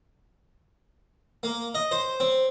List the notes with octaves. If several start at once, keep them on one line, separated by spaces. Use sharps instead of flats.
A#3
D#5
C5
C4